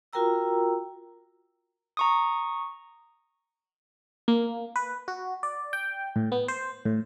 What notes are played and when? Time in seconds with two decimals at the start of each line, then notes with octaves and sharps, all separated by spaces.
0.13 F4 F#4 A#4 G5 A#5 E6
1.97 A#5 C#6 D#6
4.28 A#3
4.76 B4
5.08 F#4
5.43 D5
5.73 G5
6.16 A2
6.32 B3
6.48 C5
6.85 A2